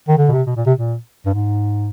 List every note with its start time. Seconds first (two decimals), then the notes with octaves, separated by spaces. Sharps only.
0.08 D#3
0.18 D3
0.29 B2
0.32 C3
0.46 B2
0.56 A#2
0.66 C3
0.75 A#2
1.26 G2
1.34 G#2